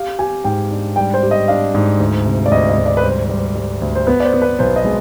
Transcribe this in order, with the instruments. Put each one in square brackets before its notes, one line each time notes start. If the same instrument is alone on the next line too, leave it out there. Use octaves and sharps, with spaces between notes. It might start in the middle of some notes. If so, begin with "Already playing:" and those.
Already playing: [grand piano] G4 [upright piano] F5
[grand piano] G4 [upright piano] G#5
[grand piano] G#2 [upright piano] G5
[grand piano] D4
[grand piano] G3 [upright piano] G5
[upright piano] C5
[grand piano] G4
[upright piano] D#5
[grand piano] D4 [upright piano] F5
[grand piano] G#2
D2
C3
[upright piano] D5
[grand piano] D2 [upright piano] D#5
[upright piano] D#5
[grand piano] D2
[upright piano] D5
B4
[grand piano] G3 [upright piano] C5
[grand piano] G3
G3
D2
[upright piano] C5
[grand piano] B3 [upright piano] B4
[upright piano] D5
C5
[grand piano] B3
[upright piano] B4
[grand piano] B1 [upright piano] C5
[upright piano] D#5
[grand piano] G#3